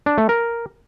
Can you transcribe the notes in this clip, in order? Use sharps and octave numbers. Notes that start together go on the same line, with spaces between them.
D4
A3
A#4